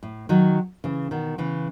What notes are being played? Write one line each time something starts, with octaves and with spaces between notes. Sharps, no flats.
A2
D#3 F#3
C#3 E3
B2 D#3
C#3 E3